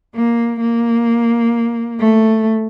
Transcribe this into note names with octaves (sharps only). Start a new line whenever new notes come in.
A#3
A#3
A3